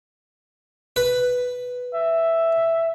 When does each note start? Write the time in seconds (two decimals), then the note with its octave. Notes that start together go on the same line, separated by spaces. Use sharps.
0.96 B4
1.95 E5